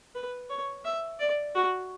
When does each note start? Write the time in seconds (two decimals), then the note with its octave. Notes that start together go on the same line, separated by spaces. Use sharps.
0.15 B4
0.50 C#5
0.85 E5
1.19 D5
1.55 F#4